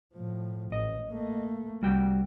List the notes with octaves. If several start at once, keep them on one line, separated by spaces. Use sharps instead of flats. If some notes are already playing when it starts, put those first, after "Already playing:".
A2 F3
A1 D#5
A3 A#3
C2 G3 F#4 G5